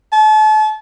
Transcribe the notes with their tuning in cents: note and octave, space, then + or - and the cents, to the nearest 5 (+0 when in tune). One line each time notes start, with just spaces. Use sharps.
A5 -35